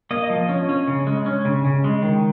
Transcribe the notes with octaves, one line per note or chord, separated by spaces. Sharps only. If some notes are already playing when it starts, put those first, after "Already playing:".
A#3 D#5
F3
C#4
C#4
C#3
G#3
C#4
C#3
C#3
G#3
D#3